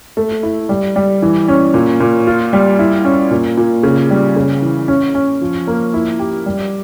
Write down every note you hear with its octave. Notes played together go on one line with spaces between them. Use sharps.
A3
E4
G3
G3
E3
C#4
A#2
A#2
F4
G3
E4
C#4
A#2
A#2
C#3
G3
C#3
E3
C#4
C#4
F3
A#3
E4
G4
G3